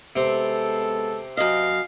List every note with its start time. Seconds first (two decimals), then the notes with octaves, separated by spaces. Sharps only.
0.16 C3 G#3 B3 C4 A4
1.37 F#2 D#5 F5